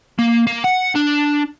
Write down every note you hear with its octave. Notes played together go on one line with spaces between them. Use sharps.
A#3
A#3
F#5
D4